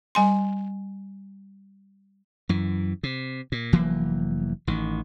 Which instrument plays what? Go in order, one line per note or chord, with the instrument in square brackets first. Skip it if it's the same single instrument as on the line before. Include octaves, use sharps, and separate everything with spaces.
[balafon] G3 G#5 C6
[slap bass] F#2 E3
C3
A#2
F1 E3 F#3 A#3
A1 D#3